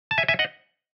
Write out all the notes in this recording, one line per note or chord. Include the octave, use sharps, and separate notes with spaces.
A5
E5 G#5
E5 G#5
D#5 F#5